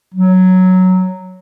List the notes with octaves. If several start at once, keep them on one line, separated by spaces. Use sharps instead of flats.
F#3